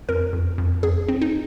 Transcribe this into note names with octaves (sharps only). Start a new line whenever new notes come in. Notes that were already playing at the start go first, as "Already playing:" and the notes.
F2 A#4
F2
F2
F2 G#4
C4
D#4